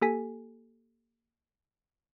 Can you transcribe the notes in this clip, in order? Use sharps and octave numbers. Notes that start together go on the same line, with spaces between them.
A#3 G4 A4 G#5 B6